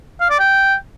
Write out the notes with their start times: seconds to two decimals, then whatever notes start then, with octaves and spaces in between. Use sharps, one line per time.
0.20 F5
0.30 D5
0.40 G5